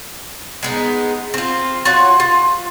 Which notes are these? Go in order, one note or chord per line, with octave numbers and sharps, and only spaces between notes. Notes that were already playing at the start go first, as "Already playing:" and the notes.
G#3 B3 D#4
C4 F4
F4 F#4 C#5 F#5
F4